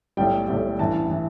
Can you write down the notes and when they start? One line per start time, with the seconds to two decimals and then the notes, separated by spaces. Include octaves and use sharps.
0.17 B1 A2 G3 G5
0.48 B1 A2 G3
0.79 A1 G2 E3 A5
1.11 E3